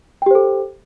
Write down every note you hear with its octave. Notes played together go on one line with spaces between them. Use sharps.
G4 A4 C5 G5